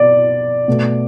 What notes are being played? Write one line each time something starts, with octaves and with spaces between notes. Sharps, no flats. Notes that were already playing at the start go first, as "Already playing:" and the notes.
Already playing: B2 B3 D5
B2 A3